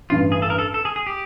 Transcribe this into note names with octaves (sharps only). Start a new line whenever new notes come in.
A1 G2 E3 F4
G#4
A4
A#4
A4
A4
G#4
G#4
G4